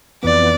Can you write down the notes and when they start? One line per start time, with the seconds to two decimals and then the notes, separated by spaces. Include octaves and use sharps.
0.23 F2 E3 B3 D5